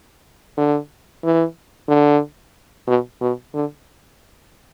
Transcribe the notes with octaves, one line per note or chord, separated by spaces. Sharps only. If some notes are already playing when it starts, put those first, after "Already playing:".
D3
E3
D3
B2
B2
D3